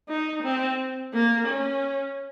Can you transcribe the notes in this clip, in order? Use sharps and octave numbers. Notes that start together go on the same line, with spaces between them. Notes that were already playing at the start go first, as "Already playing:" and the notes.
D#4
C4
A#3
C#4